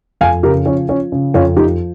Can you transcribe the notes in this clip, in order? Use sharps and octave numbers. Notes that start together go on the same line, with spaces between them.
F2 F5 G#5
C#3 G4 A#4
F3 C#4
F3 C#4
C#3
F2 C#4 F4
F3 D#4 G4